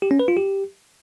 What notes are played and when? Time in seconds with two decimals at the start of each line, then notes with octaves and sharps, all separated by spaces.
0.02 G4
0.11 C#4
0.19 B4
0.28 F4
0.37 G4